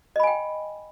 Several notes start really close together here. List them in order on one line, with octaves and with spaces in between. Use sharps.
D#5 B5 G#5 G5